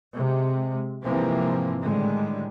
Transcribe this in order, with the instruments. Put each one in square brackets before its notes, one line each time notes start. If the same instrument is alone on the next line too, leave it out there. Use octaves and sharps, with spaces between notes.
[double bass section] C3 G#3
G#2 C3 E3 F3 A#3 C4
A2 D3 D#3 G3 G#3